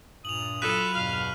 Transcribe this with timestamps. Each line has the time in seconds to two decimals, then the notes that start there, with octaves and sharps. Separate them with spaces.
0.25 G2 A#2 D#6 F7 F#7
0.62 F#3 F4 A4 B5 F#6 B6 D#7
0.95 E2 G2 B2 F5 F6